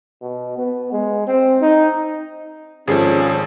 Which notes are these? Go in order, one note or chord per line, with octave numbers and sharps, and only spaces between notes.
B2
B3
G#3
C4
D#4
G#1 F3 C#4 G#4 A4